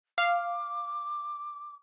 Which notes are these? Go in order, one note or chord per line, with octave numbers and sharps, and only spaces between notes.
F5 D6